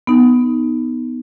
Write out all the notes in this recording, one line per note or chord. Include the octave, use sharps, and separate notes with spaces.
B3 D#4